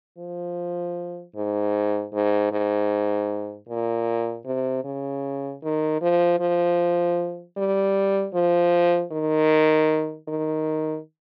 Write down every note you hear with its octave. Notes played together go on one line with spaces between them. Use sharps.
F3
G#2
G#2
G#2
A#2
C3
C#3
D#3
F3
F3
G3
F3
D#3
D#3